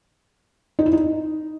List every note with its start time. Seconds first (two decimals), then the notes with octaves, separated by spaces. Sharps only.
0.79 D#4
0.86 E4
0.93 D#4